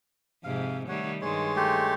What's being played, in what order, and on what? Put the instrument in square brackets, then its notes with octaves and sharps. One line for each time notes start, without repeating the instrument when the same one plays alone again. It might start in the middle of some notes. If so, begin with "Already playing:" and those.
[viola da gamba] F2 G#2 C3 [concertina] F5
[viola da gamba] D#3 G3 A3 [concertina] C#5 F#5
[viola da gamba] G2 D#3 [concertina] G#3 C#5 C6
[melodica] A3 G4